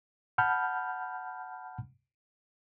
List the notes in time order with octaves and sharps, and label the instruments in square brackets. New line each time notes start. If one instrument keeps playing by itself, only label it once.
[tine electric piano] F#5 A5 B5 F6 G6